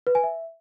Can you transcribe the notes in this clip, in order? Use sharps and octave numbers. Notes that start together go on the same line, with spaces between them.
B4
G#5
E5